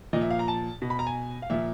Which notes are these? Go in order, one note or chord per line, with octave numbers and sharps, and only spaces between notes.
A#2 F3 D#5
E5
F5
A#5
A5
B2
B5
A#5
G#5
F5
A#2 F3 E5